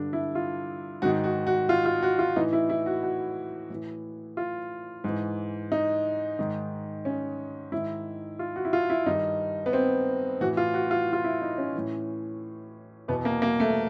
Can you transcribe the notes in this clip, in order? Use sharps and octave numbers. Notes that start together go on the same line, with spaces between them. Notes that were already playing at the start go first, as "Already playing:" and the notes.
Already playing: G2 D3 D4
E4
F4
G#2 D#3 F#4
F#4
F#4
F4
F4
F#4
F4
A2 E3 D#4
E4
E4
F#4
F#4
A2 E3
F4
G#2 E3
D#4
G#2 D#3
C#4
G#2 D#3 E4
F4
F#4
E4
F4
E4
G2 D#3 D#4
B3
C4
A2 E3 F#4
F4
F#4
F4
F4
E4
D#4
C#4
A2 E3
E2 B2 B3
A#3
A#3
A3